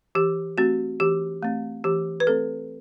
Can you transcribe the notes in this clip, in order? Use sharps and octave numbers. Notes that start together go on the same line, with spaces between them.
E3 G4
A3 C4 F#4
E3 G4
A3 C4
E3 G4
B4
A3 C4 A4